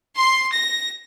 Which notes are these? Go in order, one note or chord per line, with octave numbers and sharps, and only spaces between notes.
C6
A#6